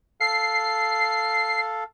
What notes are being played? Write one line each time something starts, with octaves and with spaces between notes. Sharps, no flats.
A4 F5 C7